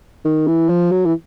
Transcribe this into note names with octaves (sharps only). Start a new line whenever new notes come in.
D#3
E3
F3
F#3
E3